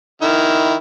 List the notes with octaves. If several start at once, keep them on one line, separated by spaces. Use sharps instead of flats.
D#3 E4